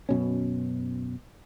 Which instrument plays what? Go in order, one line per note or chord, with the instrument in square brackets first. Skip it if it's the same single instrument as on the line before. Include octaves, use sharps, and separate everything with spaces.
[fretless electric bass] F#2 B2 C#4